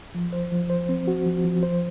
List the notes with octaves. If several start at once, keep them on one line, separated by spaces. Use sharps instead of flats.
F3
C5
F3
C5
C4
F#4
F3
F3
C5